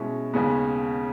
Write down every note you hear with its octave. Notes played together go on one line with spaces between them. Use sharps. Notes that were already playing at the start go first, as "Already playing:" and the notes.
Already playing: B2 G#3 C#4 E4
D#2 C#3 G#3 B3